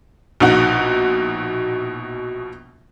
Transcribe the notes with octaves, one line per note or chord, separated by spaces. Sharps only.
A#1 B2 D#4 F#5